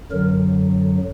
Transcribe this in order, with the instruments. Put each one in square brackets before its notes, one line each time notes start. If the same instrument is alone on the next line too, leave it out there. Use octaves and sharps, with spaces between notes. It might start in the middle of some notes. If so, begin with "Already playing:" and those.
[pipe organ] F#2 D3 F#3 A#4